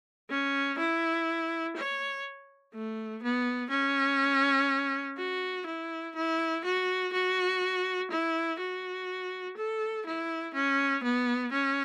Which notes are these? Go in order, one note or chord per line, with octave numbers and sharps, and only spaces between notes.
C#4
E4
C#5
A3
B3
C#4
F#4
E4
E4
F#4
F#4
E4
F#4
A4
E4
C#4
B3
C#4